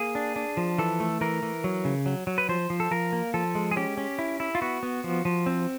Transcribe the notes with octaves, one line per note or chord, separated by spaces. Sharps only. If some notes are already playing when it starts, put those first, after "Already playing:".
Already playing: A#3 G#4
D4
D4
F3
E3 A4
A3
E3 A#4
E3
F#3
C#3
F#3
F#3
B4
F3 C5
F3
A4
F3 A#4
A#3
F3 A4
G#3
G#4
C#4 G4
C#4
E4
E4
F4
B3 F#4
B3
F3
F3
C4